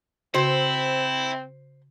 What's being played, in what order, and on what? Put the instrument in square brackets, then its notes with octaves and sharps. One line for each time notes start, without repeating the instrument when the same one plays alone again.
[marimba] C#3 F#4 [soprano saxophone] C4 [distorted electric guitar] E4 [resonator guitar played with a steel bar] C5